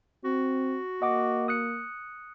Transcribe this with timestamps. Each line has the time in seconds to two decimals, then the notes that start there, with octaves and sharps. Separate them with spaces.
0.24 C4 F#4
1.02 A#3 D#5 F#5 D6
1.48 D#6 F#6 C#7